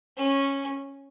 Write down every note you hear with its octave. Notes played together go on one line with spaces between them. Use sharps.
C#4